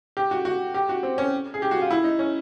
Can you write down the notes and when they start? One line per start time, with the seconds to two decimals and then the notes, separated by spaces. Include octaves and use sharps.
0.17 G4
0.31 F#4
0.45 F#4
0.74 G4
0.89 F#4
1.03 C4
1.18 C#4
1.54 G#4
1.62 G4
1.71 F#4
1.81 F4
1.91 E4
2.04 D#4
2.19 C#4